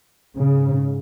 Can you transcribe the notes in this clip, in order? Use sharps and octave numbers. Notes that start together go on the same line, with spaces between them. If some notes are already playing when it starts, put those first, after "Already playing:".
G#2 C#3